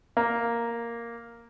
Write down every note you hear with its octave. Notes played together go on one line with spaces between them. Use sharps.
A#3